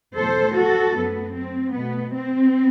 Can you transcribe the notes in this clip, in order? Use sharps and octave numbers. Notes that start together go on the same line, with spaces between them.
E2 B2 A3 A4 C5
F#4 A4
F#2 F#3 A3 B3
C4
B2 A3 B3
C4